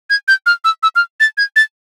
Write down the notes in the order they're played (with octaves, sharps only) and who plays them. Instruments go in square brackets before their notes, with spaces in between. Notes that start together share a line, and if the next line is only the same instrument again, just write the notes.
[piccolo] G#6
G6
F6
E6
E6
F6
A6
G#6
A6